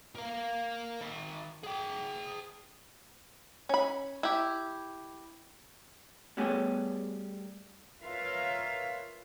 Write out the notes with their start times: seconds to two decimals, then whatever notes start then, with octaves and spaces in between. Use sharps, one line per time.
0.15 A#4 F5
1.01 D#3 B5
1.63 G#4 G5
3.69 C#4 B5
4.23 E4 G4
6.37 G3 A3 B3 G4 G#4 C#5
8.03 F4 A#4 B4 C#5 E5 F5